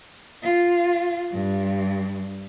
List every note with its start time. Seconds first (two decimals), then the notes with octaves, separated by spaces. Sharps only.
0.43 F4
1.32 G2